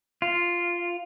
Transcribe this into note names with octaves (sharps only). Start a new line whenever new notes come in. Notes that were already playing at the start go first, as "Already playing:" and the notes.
F4